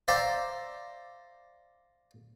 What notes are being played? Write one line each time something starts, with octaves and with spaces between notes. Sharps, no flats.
C5 D5 E5 F5 G5 A#5